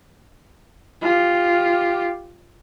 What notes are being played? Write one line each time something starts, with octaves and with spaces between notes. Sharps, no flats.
F4 G4